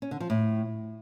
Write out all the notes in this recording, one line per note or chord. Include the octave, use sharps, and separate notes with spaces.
C#4
D3
F3
A2